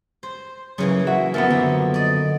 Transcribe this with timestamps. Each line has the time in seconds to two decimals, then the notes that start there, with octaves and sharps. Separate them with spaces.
0.23 C5
0.78 C#3 E3 F#3 A#3
1.07 F#4 E5
1.34 F#2 F3 A3 B3 A#4
1.50 D3 A#3
1.94 D5 D#5